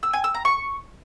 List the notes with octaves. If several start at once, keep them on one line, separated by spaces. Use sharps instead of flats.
E6
G#5
E6
A#5
C#6